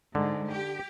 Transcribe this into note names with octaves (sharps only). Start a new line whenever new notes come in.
G#2 D3
G4